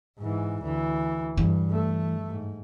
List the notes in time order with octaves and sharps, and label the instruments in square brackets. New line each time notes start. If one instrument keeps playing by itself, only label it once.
[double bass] G#2 E3
D2 E3
[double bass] G2 [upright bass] E3
[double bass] A3
G#2